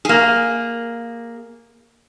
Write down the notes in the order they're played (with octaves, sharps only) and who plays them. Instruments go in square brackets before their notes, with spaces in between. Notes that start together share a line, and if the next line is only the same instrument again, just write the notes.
[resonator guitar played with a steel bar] A#3 G#4